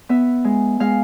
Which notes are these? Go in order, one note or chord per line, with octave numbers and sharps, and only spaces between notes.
B3 E5
G#3
G#3 F5